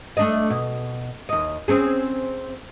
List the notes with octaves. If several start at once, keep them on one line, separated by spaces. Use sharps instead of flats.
A3 D4 D#5
B2
D#2 D#5
C4 C#4 G#4